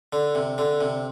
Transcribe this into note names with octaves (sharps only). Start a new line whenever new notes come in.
D3
C3
D3
C3